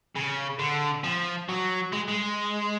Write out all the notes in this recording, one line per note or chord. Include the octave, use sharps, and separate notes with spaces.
C#3
D3
F3
F#3
G#3
G#3